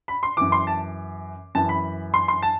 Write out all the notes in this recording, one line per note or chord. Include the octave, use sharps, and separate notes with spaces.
B5
C6
F#2 E3 D6
C6
A5
F#2 E3 A5
B5
C6
C6
A5